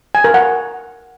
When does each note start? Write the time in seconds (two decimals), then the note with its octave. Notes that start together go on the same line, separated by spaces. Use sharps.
0.15 G#5
0.24 A#4
0.34 F#5